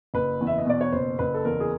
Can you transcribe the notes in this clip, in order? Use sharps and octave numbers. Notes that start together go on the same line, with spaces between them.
F#1 B4
E2
E5
D#5
B2 D5
C#5
F#1 C5
F#1 B4
A4
E2 A#4
G#4